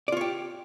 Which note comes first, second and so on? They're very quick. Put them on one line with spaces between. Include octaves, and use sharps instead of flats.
D5 F4 C#5 G4